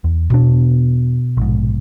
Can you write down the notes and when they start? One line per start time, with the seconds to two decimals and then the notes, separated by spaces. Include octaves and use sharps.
0.04 E2
0.30 E1 B2 D4
1.37 A#1 G#2